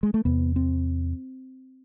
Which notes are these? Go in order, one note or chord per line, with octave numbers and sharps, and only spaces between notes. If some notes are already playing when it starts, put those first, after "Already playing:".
G#3
A3
E2 C3 B3
C4